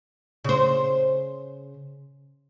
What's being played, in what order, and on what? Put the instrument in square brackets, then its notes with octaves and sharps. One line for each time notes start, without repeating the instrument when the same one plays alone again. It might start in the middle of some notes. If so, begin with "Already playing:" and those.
[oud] C#3 C5